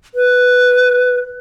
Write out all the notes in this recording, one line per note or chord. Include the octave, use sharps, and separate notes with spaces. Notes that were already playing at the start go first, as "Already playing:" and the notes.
B4